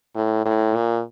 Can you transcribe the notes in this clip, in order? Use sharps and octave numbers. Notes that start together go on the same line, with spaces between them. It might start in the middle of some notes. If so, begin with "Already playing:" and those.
A2
A2
A#2